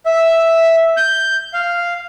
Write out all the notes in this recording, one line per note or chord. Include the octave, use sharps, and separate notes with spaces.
E5
G6
F5